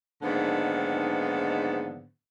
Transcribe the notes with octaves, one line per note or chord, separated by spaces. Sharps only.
G#2 D3 D#3 F3 A#3 B3